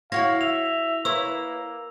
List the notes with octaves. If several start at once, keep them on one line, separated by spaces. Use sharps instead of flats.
E4 F#4 C#5 F5 A#6
E5 F7
A#3 E4 B4 C#5 E6